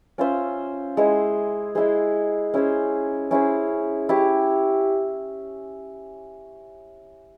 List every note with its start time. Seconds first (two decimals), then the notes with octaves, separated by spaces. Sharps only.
0.18 C#4 F4 C5 E5
0.97 G#3 E4 G#4 C5
1.75 G#3 E4 G#4 C5
2.54 C#4 E4 G#4 C5
3.31 C#4 E4 G#4 C5
4.09 E4 G4 C#5